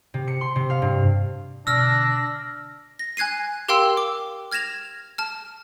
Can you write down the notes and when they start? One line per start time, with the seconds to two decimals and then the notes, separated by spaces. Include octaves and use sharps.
0.14 C3
0.28 C#7
0.41 C6
0.56 C3
0.70 F5
0.82 G2
1.67 B2 D3 D4 E6 F6 A#6
2.99 A#6
3.17 G#5 F#6 G#6 C7 D#7
3.68 G4 A#4 F5 G5 C6 E6
3.97 D6
4.51 F6 G#6 A#6 E7 F7
5.18 A5 F6